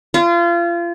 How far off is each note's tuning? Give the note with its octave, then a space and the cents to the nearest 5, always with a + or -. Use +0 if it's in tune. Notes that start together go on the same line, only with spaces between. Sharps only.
F4 -30